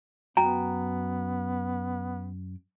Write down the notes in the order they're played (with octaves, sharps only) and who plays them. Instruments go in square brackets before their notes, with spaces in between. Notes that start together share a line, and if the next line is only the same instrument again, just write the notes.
[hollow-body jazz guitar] F#2 F#4 G5 [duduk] B3 [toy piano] A#5